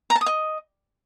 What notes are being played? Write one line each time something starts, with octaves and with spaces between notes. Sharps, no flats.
A#5
A5
D#6
D#5